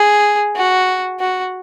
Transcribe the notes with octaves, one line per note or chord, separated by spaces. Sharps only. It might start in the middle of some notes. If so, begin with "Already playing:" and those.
Already playing: G#4
F#4
F#4